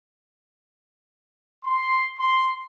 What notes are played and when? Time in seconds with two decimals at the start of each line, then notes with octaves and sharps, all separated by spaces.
1.64 C6
2.19 C6